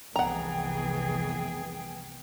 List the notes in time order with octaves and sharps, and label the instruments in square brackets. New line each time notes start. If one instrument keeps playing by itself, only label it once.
[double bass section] F1 C2 B3 [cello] E3 G#4 [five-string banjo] F#5 A#5 [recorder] G5